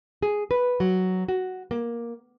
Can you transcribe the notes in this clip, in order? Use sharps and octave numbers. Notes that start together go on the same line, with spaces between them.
G#4
B4
F#3
F#4
A#3